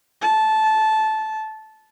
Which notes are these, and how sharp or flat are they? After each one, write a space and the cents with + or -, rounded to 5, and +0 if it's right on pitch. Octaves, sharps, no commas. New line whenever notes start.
A5 -15